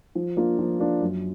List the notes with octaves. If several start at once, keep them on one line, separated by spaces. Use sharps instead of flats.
F3
A#3 D4 F4
F3
A#3 D4 F4
F#2